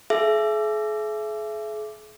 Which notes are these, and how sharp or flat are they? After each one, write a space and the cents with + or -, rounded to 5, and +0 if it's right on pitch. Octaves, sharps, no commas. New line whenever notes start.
G#4 +45 E5 +25